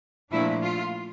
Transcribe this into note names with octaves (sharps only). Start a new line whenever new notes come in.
A#2 F3 A3 D4 E4
F4